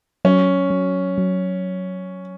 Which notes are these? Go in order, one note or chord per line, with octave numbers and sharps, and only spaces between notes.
F#3 C#4
F#3
F#3